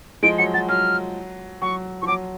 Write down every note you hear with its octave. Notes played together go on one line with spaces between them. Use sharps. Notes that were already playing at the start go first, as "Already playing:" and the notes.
F3 G#3 D7
F#3 C#7
F#3 A6
F#3 F6
F#3 C#6
F3 C#6
F#3 D6